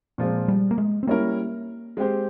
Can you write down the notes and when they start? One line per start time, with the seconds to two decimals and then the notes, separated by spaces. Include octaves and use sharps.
0.18 A#2 F3 G#3 C4
0.48 G3
0.71 A#3
0.78 G#3
1.03 C4
1.07 G3 A#3 C#4 E4 A#4
1.97 G#3 C4 G4 C5